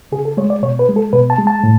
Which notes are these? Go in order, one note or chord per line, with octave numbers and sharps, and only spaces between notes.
C#3 G#4
A4
G#3 C#5
D5
B2 C#5
B4
G#3
A4
B2 B4
A5
G#3
A5
A2